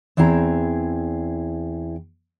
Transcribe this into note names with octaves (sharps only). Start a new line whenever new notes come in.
E2 C4 E4 G#4 A#5